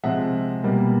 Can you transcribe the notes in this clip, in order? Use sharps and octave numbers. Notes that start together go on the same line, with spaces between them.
C3 F3 G#3 E5 F#5
B2 G3 A#3